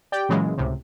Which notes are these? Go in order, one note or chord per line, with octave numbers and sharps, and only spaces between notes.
G4 D5 G5
A#2 C#3 E3 F#3 G#3
C#2 A2 C3